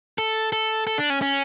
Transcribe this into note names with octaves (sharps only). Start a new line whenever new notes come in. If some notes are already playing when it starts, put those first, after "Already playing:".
A4
A4
A4
D4
C#4
C#4